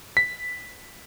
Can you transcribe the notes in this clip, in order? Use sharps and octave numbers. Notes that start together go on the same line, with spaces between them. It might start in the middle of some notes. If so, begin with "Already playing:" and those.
B6